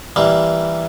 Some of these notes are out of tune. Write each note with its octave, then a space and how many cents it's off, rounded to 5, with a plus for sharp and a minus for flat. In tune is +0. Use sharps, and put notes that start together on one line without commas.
E3 +5 G3 +15 A#3 +0